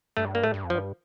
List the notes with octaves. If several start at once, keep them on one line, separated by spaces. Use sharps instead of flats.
G2 A3
A#3
A2 A3
G2
F2
F3
G2